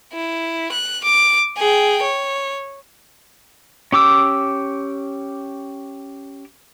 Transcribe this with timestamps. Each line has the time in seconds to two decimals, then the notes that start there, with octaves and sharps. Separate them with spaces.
0.13 E4
0.72 F#6
1.04 D6
1.57 G#4 G5
2.03 C#5
3.92 C#4 G4 D6 E6